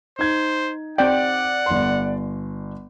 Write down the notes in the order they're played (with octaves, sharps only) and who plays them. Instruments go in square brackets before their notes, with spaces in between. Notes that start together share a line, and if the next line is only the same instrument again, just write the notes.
[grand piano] D#4 G#6 [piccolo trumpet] C5
[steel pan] C4 G5 [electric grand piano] D5 [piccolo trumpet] F#5
[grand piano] G1 C6